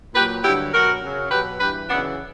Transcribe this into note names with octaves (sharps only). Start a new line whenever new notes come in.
A#2 F#3 G4 B4
G2 D3 F#3 E4 G4
B2 F#3 F#4 A#4
F#2 C#3 F#3
B2 F#3 G4 B4
G2 E3 G4 B4
F#2 C#3 E3 B3 D4